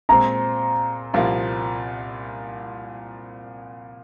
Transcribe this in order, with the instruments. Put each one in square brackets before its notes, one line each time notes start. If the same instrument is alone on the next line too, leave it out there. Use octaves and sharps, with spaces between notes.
[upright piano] A#2 G#3 C4 [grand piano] A#5
[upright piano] C2 A#2 F3 A#3 F4